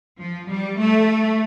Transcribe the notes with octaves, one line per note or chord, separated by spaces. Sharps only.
F3
G3
A3